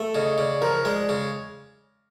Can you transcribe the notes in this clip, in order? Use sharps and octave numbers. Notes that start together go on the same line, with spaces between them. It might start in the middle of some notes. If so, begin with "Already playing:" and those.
Already playing: A3
C#3 D#5
C#3 D5
F3 A#4
G#3 D5
C#3